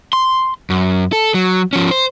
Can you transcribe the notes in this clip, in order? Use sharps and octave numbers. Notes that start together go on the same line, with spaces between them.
C6
F#2
A4
F#3
F3 C#4
C5